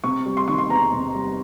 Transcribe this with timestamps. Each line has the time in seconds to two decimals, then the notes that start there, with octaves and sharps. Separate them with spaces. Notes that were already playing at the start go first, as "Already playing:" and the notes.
0.04 C3 C#6
0.26 G3
0.37 C6
0.48 D#3 C#6
0.58 C6
0.70 E2 A#5
0.92 C3
1.15 G3